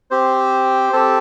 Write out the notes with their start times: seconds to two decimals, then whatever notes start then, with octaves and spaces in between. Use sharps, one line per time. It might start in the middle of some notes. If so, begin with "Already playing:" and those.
0.11 C4 G4 C5
0.93 C4 G4 A4 A5